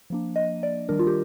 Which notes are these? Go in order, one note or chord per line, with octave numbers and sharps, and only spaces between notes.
F3 A#3 D4
D#5
D5
D#3 G3 D4 A#4
F4
G4